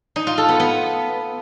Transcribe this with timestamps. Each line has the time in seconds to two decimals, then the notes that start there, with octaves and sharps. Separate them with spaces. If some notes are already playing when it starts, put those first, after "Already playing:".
0.16 D#4
0.27 F4
0.38 A4
0.49 B3
0.59 B3